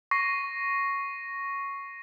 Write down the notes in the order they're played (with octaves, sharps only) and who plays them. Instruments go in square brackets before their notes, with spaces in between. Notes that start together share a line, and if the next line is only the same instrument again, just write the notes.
[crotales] C#6 A#6 C7